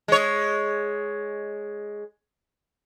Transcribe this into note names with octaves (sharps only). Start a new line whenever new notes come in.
G#3 C#5